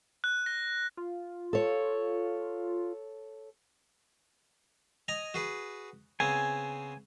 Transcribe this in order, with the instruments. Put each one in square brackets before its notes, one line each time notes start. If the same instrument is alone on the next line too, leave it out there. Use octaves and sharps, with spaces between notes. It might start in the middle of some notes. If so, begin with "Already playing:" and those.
[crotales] F#6
A#6
[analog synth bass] F4
[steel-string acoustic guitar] A4 C#5
[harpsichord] D#5 G#5 A#5
F#4 G#4 B4
[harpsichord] C#3 B3 C4 [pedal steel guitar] G#5